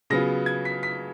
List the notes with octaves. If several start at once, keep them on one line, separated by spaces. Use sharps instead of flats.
C#3 F#3 B3 F4 A#6
G#6
B6
B6